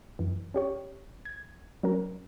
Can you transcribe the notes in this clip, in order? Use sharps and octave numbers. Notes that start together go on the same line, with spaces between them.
F#2 E3
C#4 G4 C#5
G#6
F#3 C#4 A#4